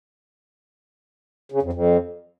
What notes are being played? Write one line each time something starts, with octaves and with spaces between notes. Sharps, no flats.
C#3
F2
F2